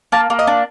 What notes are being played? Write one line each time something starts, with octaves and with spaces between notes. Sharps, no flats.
A#3 A5
A#3
D#5
D4